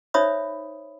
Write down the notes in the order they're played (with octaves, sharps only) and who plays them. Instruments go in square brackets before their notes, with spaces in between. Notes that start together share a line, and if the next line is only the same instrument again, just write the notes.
[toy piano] D#4 C5 C#5 E5 B5 D#6